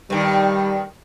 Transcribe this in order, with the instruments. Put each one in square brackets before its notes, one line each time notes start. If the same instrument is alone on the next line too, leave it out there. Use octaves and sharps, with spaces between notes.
[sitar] G2 D#3 [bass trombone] G3